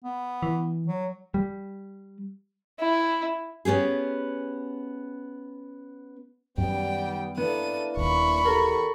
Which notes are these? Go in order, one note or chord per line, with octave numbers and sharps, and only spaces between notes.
B3
E3
F#3
G3
E4
B3 C#4 G4 G#4
F#2 D#3 G3 B3 G5
A#3 B3 D4 E4 A4 D#7
D#1 B5 C#6
E2 G4 A4 A#4